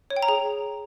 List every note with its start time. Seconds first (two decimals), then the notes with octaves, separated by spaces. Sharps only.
0.10 C#5
0.16 G5
0.22 A#5
0.29 G#4